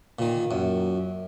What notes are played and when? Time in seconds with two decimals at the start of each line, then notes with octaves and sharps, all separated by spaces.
0.19 A#2 D#3
0.51 F#2